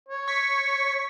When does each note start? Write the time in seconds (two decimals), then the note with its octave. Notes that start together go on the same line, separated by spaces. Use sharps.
0.08 C#5
0.28 C#6 B6